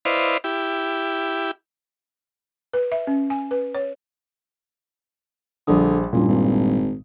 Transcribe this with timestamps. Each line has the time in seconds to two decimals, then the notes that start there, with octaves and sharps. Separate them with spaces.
0.05 E4 B4 C5 D5 D#5 F5
0.44 E4 G4
2.74 B4
2.92 E5
3.07 C#4
3.30 G#5
3.51 B4
3.75 C#5
5.67 A#1 D3 G3 D#6
6.13 F#1 G2 A#2
6.28 G#1